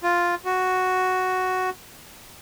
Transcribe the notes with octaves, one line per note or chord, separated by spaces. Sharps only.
F4
F#4